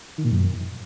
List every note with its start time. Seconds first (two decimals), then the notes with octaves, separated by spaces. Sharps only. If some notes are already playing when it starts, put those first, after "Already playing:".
0.18 D#3
0.24 A#2
0.31 F#2